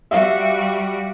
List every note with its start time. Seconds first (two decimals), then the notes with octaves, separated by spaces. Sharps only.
0.11 G3 F#4 E5 F5